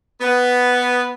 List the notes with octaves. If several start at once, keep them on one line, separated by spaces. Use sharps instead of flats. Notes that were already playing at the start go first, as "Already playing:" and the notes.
B3